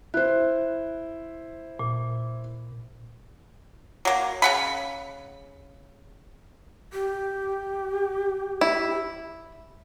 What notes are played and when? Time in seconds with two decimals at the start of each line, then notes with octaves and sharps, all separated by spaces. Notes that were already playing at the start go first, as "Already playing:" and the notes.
0.14 E4 C5 F#6
1.79 A#2
4.05 F#3 A#3
4.42 C#3 F#5 B5
6.92 G4
8.61 E4